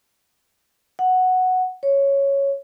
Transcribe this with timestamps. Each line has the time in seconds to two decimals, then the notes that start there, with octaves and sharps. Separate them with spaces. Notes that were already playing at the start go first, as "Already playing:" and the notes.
0.99 F#5
1.83 C#5